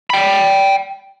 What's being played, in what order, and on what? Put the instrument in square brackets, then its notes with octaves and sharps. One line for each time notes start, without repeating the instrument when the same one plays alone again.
[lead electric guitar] G5 B5